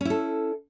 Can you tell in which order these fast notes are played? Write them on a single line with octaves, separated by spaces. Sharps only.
C#4 E4 A4